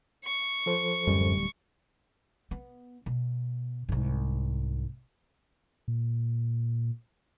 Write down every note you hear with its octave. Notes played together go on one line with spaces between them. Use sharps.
C#6
F3 A4 C5
D1 F#2 G3
B3
B2
C2 G#2
A#2